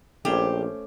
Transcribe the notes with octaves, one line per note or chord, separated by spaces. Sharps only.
A#1 A3 C#4 G4 C5